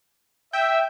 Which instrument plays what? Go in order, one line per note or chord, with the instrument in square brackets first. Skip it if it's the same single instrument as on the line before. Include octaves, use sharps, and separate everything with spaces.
[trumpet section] E5 [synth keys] G5